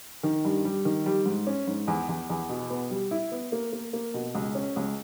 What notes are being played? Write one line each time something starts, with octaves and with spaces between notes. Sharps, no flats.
D#3
G2
G3
D#3
G3
G#2
C#4
G#2
E2
E2
E2
B2
B3
G3
E4
B3
A#3
A#3
A#3
B2
C#2
C#4
C#2